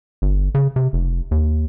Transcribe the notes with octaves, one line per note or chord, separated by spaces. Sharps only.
G1
C#3
C3
F1
D#2